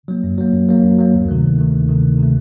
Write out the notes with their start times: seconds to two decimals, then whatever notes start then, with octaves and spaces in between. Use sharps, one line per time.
0.08 F#3 A#3
0.24 F#2
0.38 F#3 A#3
0.53 F#2
0.68 F#3 A#3
0.83 F#2
0.99 F#3 A#3
1.14 D2
1.29 C3 D#3 A3
1.43 D2
1.59 C3 D#3 A3
1.73 D2
1.89 C3 D#3 A3
2.03 D2
2.18 C3 D#3 A3